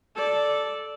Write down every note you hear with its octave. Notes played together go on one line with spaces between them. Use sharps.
A4 D5